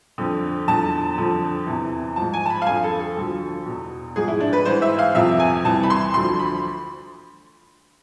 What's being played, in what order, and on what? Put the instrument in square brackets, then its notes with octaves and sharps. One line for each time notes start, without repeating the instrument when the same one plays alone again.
[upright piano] F2 D3 F3
E2 D3 F3 A5
F2 D3 F3
E2 C3 E3
G#2 F3 A5
G#5
A5
B5
F5
F2 D3 F3 G#5
A4
A4
D2 D3 F3
E2 B2
G#2 F3 G#4
E4
D4
B4
G#2 E3 C5
E5
F5
F2 C3 F3 E5
G#5
C2 C3 E3 A5
B5
C6
D2 D3 F3 C6
B5